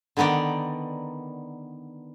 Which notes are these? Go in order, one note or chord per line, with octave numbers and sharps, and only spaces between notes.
D3 D#3 B3 D#4 D5